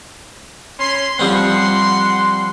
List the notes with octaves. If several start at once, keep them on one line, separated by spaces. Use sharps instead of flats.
C#4 B5 C6
F3 G3 C4 F#5 C6